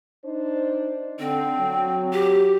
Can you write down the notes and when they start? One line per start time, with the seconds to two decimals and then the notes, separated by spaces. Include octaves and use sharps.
0.24 D4 D#4 C5
1.19 D3 C4
1.58 F#3
2.13 G4